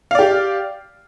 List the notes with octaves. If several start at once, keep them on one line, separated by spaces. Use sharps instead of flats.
G4 D5 F5